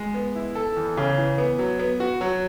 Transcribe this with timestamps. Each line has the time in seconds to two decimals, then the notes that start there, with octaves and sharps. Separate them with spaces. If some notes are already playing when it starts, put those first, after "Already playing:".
Already playing: G#3
0.14 B3
0.35 E4
0.55 A4
0.76 E2
0.97 C#3
1.18 E3
1.38 B3
1.59 F#3
1.79 B3
2.00 F#4
2.21 F#3